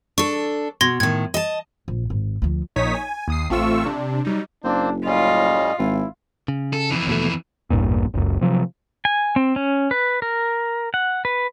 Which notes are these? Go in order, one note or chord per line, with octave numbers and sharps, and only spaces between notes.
D4 A4 C#6
B2 C6 G#6 A#6
A2 D#3 G#6
D#5 A5
A#1
G#1
D2 F3
A#1 A#2 D#4 C#5 D#6 B6
G#5
D#2 D#6 C7
A1 A3 C4 F4 C#6 E6
C3 D4
F#3 G3 D#4
F#1 A#3 C4 D4 C5
A2 G3 C#4 F4 D#5
G#1 E4
C#3
A4
F2 E3
D#2 B2 A3
A1 E2 G2 A#2
F#1 C#2 F#2
C3 F3 F#3
G#5
C4
C#4
B4
A#4
F#5
B4